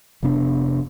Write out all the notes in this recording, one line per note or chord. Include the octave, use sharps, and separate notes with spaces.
F1 C3 B3 D4